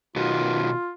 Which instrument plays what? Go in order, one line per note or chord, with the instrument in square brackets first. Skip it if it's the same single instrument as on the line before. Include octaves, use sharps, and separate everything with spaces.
[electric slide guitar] B2 D#3 F#4 [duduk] F4